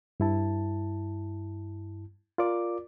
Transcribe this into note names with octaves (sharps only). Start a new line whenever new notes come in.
G2 E4 A5
F4 A#4 D5 D6